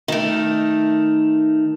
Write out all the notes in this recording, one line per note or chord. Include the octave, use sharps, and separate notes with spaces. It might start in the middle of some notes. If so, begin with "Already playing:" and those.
D#3 A3